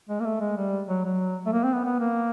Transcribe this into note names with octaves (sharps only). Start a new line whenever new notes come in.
G#3
A#3
A3
G#3
G3
F#3
F#3
A3
A#3
C4
B3
B3
A#3